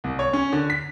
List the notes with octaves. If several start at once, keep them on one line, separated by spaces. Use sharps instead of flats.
C2
C#5
C#4
D3
B6